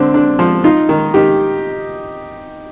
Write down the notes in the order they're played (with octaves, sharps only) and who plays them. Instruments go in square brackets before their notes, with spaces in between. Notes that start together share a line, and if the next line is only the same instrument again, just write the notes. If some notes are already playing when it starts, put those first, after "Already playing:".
Already playing: [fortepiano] D3 [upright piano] C4
[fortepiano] D4
F3
[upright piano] D#4 [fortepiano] F4
[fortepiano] D#3
[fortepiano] D#3 [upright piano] G4